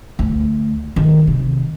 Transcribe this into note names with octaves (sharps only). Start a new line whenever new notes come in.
D2
D#3
C3